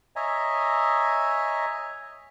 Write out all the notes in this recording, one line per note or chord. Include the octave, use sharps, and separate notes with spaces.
C#5 D#5 E5 G#5 A#5